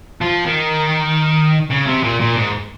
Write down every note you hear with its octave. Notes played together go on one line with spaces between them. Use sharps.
F3
D#3
C#3
C3
A#2
A#2
G#2